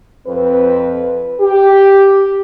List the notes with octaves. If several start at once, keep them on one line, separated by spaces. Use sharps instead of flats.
F2 C4 B4
G4